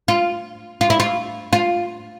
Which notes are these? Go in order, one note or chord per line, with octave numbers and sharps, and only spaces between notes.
F4
F4
E4
F4
F4